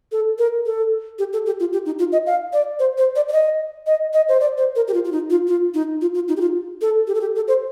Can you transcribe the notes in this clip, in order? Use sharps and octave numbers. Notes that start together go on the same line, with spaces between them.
A4
A#4
A4
G4
A4
G4
F4
G4
D#4
F4
D#5
F5
D5
C5
C5
D5
D5
D#5
D#5
D#5
C5
D5
C5
A#4
G4
F4
F4
D#4
F4
F4
D#4
F4
F4
D#4
G4
F4
A4
G4
A4
G4
A4
C5